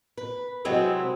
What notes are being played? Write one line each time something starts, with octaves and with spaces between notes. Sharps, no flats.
B4
C3 F#3 G#3 C4 E4